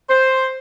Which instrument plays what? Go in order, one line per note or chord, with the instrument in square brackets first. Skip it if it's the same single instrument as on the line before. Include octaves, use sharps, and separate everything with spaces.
[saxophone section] C5